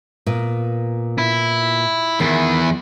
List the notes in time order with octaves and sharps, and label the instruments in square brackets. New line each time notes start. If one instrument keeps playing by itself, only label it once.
[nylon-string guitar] A#2 B3
[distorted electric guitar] E4
[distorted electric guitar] E2 E4 [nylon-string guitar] D#3